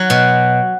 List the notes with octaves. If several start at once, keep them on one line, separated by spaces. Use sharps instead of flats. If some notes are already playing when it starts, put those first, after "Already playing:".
Already playing: F#3 F#5
B2